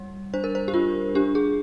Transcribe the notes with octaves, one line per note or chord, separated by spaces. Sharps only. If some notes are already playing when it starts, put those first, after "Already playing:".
Already playing: G3
D4 C5
A#4
C5
G4
D4 F4
D4 G4
G#4